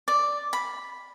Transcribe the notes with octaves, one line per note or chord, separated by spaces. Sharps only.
D5
B5